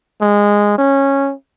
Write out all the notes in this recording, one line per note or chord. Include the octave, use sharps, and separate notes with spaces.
G#3
C#4